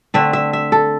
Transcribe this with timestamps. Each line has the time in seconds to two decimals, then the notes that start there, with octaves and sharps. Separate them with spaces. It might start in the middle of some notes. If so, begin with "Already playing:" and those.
0.14 D3 A3 C4 E5
0.33 E5
0.53 E5
0.72 A4